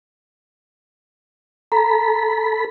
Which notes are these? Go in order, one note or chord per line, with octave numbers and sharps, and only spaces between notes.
A4 A#5 B5